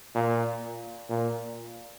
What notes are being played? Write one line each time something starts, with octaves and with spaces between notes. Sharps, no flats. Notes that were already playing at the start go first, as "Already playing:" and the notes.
A#2
A#2